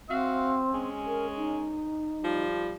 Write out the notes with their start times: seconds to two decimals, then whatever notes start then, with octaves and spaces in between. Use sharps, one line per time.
0.09 C4 F#4 E5 F5
0.72 G#3 C#4
1.06 A#4
1.36 D#4
2.22 F3 G3